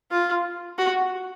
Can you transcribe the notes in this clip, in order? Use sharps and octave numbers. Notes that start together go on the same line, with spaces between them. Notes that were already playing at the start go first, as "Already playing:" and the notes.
F4
F#4